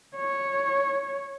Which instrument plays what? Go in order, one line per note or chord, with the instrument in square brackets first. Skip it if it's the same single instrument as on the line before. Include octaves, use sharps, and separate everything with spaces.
[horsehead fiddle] C#5